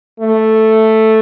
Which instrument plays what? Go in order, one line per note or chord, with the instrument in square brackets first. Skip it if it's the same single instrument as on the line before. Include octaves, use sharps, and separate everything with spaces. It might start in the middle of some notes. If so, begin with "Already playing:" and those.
[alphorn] A3